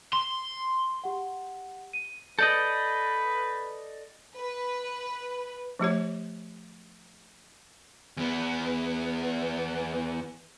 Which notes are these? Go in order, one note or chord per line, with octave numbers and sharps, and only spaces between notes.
C6
G4 F#5
D#7
A4 B4 D5 D#5 G6
B4
F3 A3 G4 C#5
E2 B3